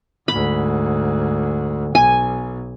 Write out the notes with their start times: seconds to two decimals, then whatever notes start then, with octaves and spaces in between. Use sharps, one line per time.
0.28 D2 G#2 B5
1.95 B1 G#5